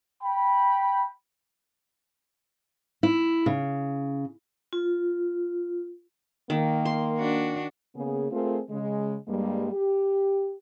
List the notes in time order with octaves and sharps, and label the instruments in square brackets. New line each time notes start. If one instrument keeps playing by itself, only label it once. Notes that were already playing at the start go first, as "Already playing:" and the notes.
[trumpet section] G5 B5
[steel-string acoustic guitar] E4
C#3
[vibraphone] F4
[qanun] D#3 [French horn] A#3
[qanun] C6
[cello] D4 F#4
[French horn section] C#3 A#3 B3 G#4
A3 C4 F4 G#4 A#4
C#3 G#3
G2 G3 G#3 A#3
G4